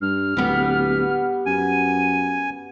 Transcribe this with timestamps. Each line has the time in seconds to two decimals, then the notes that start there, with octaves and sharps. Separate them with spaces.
0.02 G2 F6
0.37 D1 G3 B3
1.46 F#2 G#5 D#7